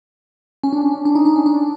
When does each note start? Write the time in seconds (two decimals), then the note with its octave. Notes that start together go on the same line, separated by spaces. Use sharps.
0.63 C#4
0.73 D4
0.81 C#4
1.05 D4
1.15 D#4
1.25 D4
1.36 C#4
1.46 D4